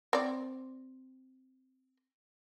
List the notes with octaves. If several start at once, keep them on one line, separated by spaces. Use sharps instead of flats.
C4 D5